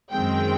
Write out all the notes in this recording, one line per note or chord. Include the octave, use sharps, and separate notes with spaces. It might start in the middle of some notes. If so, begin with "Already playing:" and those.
F#2 D#3 G#3 C4 G5